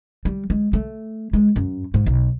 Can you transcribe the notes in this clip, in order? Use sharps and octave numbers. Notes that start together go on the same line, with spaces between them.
G3
G#3
A3
G#3
F#2
G#2
B1